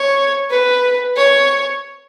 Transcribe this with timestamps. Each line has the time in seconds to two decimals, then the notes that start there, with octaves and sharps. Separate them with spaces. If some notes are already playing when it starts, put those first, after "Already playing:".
Already playing: C#5
0.51 B4
1.16 C#5